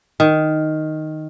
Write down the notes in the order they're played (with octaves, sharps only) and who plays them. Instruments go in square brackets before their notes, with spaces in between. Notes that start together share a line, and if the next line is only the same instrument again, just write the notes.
[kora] D#3